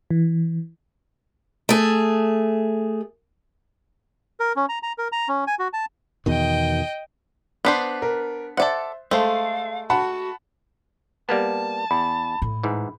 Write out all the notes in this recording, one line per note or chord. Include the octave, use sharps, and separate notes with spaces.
E3
A3 G#4
A#4
C#4
A#5
A#5
A#4
A#5
C#4
G#5
F#4
A5
E2 B2 D#3 D#5 G5
B3 D4 C5 F#6 B6 C7
A#4
A4 C5 D5 E5 F#5
G#3 A3 A4 C5 F5
F#4 F#5 A5 B5
G3 A#3 B3 A5
E2 B5
A2
G#2 E3